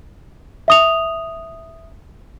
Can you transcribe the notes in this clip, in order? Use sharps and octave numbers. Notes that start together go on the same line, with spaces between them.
E5 D#6 F7